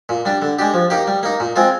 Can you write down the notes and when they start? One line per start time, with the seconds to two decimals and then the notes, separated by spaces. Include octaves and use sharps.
0.09 A#2
0.25 G3 D4
0.42 D3
0.59 G#3 D4 G4
0.74 F3
0.90 A#3 D#4 G4
1.07 G3
1.23 A#3 D#4
1.40 A#2
1.56 G#3 C4 F4